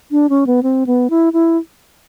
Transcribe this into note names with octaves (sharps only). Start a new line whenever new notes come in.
D4
C#4
B3
C4
B3
E4
E4